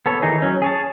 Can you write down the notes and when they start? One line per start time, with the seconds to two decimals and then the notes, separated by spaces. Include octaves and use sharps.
0.06 B3 A4 C#5
0.22 D#3 E3 D#4 G#4
0.42 F#3 C#4
0.62 G#4 C#5 A5